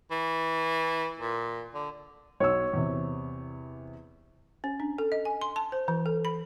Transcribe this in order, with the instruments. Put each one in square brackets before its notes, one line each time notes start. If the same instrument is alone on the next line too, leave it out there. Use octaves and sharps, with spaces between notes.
[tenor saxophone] E3
A#2
D3
[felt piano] B1 E6 [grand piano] C#5
[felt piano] E2 C3
[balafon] C#4
D4
A4
D#5
G#5
C6
A5
C5
E3
A4
B5